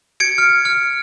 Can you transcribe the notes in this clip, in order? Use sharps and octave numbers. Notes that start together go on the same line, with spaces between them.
G#6 C#7 D7
F6
F6